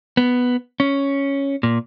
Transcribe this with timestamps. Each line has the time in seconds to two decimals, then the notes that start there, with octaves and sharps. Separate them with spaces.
0.17 B3
0.80 C#4
1.63 A#2